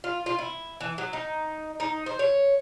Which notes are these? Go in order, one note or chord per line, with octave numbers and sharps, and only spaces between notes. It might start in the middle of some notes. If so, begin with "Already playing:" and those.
F4
F4
E4
E3
F#3
D#4
D#4
C5
C#5